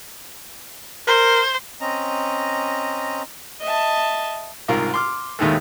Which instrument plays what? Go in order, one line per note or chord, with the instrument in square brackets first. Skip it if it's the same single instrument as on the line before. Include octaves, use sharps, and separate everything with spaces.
[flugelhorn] A#4 [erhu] C5
[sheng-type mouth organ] C4 C#4 D#5 A#5
[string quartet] D#5 E5 A5
[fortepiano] C2 G#2 F4 A#4
C6 D6 F6
D#2 A2 D#3 G#3 A3